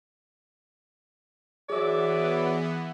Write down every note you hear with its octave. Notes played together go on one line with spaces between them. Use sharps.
E3 F#3 B3 G#4 D5 E5